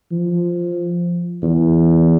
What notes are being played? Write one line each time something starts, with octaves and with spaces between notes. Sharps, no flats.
F3
E2